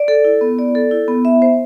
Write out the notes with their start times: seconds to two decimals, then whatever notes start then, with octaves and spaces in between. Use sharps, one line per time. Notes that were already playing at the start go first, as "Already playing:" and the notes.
Already playing: D5
0.08 A4
0.25 E4
0.41 B3
0.59 D5
0.75 A4
0.91 E4
1.08 B3
1.25 E5
1.42 C5